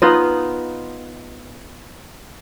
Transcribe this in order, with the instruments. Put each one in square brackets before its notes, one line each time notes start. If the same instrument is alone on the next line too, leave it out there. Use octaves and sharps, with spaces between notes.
[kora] B3 D#4 F4 D#5